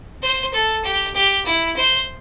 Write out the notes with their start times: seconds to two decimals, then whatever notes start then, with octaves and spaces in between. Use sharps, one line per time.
0.22 C5
0.54 A4
0.85 G4
1.15 G4
1.46 E4
1.76 C5